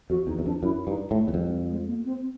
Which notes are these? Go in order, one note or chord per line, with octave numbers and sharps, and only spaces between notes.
F2 F#4
E2 D#4
E2
F2 D4
F#2 E4
G2 D#4
A2 A3
E2
F2 G3
G3
G#3
A#3
C4